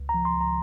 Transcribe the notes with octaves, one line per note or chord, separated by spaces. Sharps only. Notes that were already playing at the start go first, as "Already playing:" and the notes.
Already playing: C#2
A#5
F3
C6
C#2
A#5